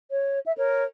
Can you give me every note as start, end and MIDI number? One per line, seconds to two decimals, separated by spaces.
0.10 0.38 73
0.45 0.52 76
0.57 0.84 70
0.57 0.84 73